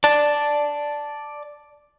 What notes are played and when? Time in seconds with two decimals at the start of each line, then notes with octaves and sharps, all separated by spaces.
0.04 D5 A5